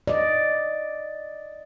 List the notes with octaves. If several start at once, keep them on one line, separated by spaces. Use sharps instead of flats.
D5 D#5